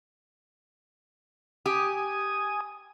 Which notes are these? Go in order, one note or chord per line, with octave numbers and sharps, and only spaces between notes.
G4 G#5 D#6